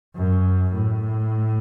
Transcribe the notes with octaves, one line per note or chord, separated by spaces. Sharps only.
F#2
A2